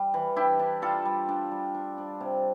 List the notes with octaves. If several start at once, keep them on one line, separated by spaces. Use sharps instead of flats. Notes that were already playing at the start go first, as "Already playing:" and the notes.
Already playing: G3
E3
D4 E4 G4
D4
G3 F4 A4
G3
D4
G3
D4
D4
C3